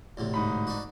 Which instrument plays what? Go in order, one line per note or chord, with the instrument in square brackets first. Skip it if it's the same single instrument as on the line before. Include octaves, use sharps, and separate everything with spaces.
[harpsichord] D2 A2 C3
[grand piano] G#2 D#4 B5
[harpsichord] D4 F#4